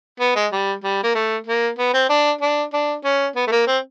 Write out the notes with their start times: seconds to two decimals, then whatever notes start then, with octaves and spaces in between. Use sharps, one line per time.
0.20 B3
0.36 G#3
0.52 G3
0.83 G3
1.04 A#3
1.15 A3
1.47 A#3
1.78 B3
1.94 C4
2.09 D4
2.41 D4
2.73 D4
3.04 C#4
3.36 B3
3.47 A3
3.52 A#3
3.67 C4